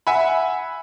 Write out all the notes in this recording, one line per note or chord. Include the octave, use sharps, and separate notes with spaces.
E5 F#5 G#5 B5